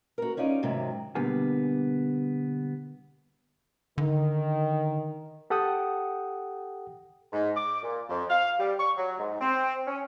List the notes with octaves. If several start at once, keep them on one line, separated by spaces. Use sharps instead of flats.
F#4 A#4
C#4 D#4 F4 D5
F2 G#2 C3 D#3 F#3
B2 D3 G3 A#3 B3 G#4
D3 D#3
G4 A4 F#5 G5 D#6
G#2
D6
A#2
F2
F5
G3
C#6
F#3
G#2
C4
C#4